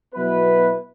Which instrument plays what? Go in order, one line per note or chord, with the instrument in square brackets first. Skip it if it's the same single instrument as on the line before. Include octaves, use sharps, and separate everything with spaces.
[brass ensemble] B2 F#3 B3 E4 B4